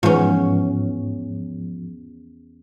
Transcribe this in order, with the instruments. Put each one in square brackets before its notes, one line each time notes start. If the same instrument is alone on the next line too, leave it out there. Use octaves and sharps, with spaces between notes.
[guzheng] E2 C#4 [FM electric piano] G#2 F3